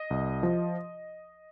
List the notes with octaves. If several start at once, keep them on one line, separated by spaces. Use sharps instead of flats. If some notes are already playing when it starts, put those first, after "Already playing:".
Already playing: D#5
C2
F3